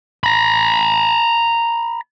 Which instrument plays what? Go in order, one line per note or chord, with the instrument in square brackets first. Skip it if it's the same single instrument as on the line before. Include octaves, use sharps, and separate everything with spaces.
[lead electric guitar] A#5 B5